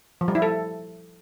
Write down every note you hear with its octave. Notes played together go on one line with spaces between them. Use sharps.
F3
G3
E4
A4